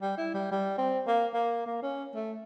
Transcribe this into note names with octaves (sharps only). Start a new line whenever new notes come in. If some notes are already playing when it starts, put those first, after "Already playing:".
G3
E4
G3
G3
C4
A#3
A#3
A#3
C#4
A3